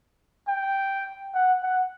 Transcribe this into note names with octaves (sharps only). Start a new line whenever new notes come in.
G5
F#5
F#5